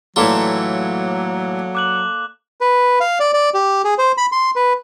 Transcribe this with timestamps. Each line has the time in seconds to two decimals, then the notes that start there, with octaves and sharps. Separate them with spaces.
0.16 A2 E3 F#3 A#3 F4 A4 D5
1.75 D6 F#6 F#7
2.61 B4
3.00 F5
3.20 D5
3.34 D5
3.54 G4
3.85 G#4
3.98 C5
4.18 B5
4.32 C6
4.56 B4